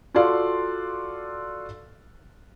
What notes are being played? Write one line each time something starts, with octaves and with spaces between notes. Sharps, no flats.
F4 F#4 A4 D5 F5 C6